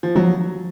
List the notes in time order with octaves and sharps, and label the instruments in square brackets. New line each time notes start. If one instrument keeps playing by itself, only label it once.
[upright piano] F3
[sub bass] F3 [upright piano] F#3